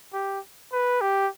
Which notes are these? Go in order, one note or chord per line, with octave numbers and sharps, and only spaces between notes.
G4
B4
G4